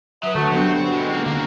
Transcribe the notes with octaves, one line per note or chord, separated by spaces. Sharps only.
F#3 B4 E5 D#6
D3 A3 F#4
G2 F#3 B3 C4 C5
B2 G#3
C#2 A#3 C4
C#2 D3 A#3 F#4